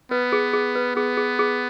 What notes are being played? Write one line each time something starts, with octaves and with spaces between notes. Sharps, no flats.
B3 B4
G#4
G#4
B4
B3 G#4
G#4
G#4